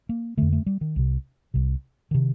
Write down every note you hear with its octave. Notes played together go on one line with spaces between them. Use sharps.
A#3
F2 D3 A3
A3
G3
D#3
C2 C3
C2 C3
C3 D#3